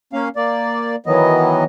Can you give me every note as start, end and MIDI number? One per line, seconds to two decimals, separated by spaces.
0.13 0.29 58
0.13 0.29 61
0.13 0.29 77
0.36 0.96 58
0.36 0.96 74
1.06 1.64 51
1.06 1.64 52
1.06 1.64 54
1.06 1.64 59
1.06 1.64 75